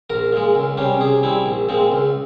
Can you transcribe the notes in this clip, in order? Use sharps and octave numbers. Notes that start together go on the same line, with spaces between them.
A#1 A#4
A#2 G#3
C#2
C3 G3 C#4
C3 G#4
G3 C4 E4
A#1
A#2 G#3 C4
C#2